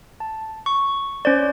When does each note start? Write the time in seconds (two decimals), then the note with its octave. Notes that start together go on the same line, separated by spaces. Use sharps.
0.20 A5
0.66 C#6
1.25 C#4 C5 D5